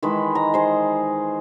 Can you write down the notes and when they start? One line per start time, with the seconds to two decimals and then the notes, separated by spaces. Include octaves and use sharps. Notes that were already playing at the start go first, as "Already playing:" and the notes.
0.03 D#3 E3 G#3 B4
0.35 A#5
0.54 G#4 C5